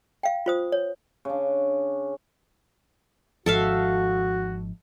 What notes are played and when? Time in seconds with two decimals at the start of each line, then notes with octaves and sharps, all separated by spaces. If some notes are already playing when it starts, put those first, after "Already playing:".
0.23 F5 G5
0.46 F4 C5 D#6
0.72 C#5
1.25 C#3 D4
3.46 G#1 G#2 F3 F#4 A4 E5 F5